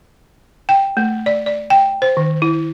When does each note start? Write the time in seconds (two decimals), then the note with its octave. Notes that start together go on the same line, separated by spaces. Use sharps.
0.69 G5
0.97 A3
1.26 D5
1.46 D5
1.70 G5
2.02 C5
2.17 D#3
2.42 E4